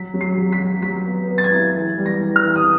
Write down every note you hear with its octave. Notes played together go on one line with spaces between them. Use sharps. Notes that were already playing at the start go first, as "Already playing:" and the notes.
Already playing: F#3 B6
F#3
C7
F#3
B6
F#3
F#3 B6
B3
B3
A6
G#6
E4
E3
G3
A#6
E3
F6
E3
D#6